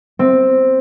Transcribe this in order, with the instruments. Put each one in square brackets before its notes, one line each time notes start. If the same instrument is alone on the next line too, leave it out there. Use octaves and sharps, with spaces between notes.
[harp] C4